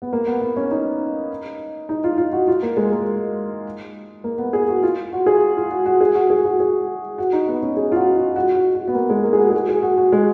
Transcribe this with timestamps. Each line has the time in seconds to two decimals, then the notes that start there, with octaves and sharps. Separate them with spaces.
0.02 B3
0.13 A#3
0.27 B3
0.41 B3
0.57 C#4
0.71 D#4
1.89 D#4
2.04 F4
2.18 F4
2.33 F#4
2.48 F4
2.62 A#3
2.77 G#3
2.92 A#3
4.24 A#3
4.38 B3
4.53 G#4
4.68 F#4
4.83 F4
5.13 F#4
5.26 G#4
5.57 F4
5.71 F#4
5.86 F#4
6.01 G#4
6.15 F#4
6.30 G#4
6.45 F#4
6.60 G#4
7.18 F#4
7.33 D#4
7.48 B3
7.63 C#4
7.77 G#4
7.92 F4
7.96 F#4
8.17 F4
8.36 F#4
8.55 F#4
8.75 F#4
8.88 B3
8.94 A#3
9.10 G#3
9.24 A#3
9.33 G#4
9.38 F#4
9.50 G#4
9.54 F#4
9.69 G#4
9.83 F#4
9.98 F#4
10.12 G#3